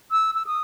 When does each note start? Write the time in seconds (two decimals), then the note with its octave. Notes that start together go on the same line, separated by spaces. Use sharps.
0.11 E6
0.35 E6
0.46 D#6